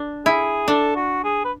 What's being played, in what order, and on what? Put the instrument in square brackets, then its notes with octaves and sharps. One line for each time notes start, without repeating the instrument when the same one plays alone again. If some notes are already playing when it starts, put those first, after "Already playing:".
Already playing: [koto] D4
[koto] E4 [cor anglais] G#4
[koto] D4 [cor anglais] A4
[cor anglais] F#4
G#4
B4